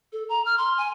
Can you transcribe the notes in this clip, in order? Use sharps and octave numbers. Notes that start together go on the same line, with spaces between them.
A4
A#5
F6
C6
G#5